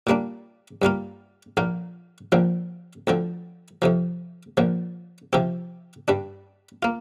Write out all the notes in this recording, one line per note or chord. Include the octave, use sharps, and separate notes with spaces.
A#2 G3 A#3 D4
G2 G3 A#3 F4
A#1 A#2 A#3 F4
A#1 A#2 F3 C4
D2 D3 F3 C4
F2 C3 F3
A#1 A#2 F3
C3 F3 C4 G4
G2 G3 D4
A#3 F4